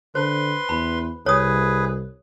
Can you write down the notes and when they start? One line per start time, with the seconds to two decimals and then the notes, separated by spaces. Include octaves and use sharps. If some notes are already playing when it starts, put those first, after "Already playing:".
0.15 D3 B4 C5 C6
0.69 E2 B5
1.26 C2 G#4 B4 C#5 D#6